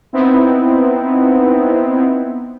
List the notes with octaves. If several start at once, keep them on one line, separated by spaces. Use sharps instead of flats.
B3 C4 D#4 E4